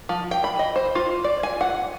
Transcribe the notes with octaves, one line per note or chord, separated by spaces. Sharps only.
F3
G5
B5
D#5
C5
F4
D5
G#5
F#5